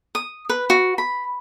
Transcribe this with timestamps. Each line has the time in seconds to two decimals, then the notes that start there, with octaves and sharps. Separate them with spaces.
0.15 D#6
0.49 B4
0.70 F#4
0.98 B5